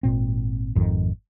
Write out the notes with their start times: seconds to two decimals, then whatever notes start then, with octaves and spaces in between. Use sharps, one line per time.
0.03 G#1 A#2 C4
0.75 G#1 F2 G#2 D#3